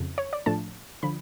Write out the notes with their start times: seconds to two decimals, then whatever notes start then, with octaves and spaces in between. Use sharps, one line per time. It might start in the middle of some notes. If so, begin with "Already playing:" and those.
Already playing: F2 C#3 F3
0.18 C#5
0.33 D5
0.46 A2 F3 A3 D4 A5
1.03 D3 F3 B5